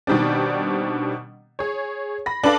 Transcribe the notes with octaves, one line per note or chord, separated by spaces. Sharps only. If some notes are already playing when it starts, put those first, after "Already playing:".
B2 D#3 G3 C4 D4
G#4 C#5
B5 A#6
D4 A4 B4 D5 F5